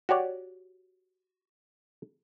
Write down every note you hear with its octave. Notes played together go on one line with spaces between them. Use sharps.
F#4 G4 C#5 D5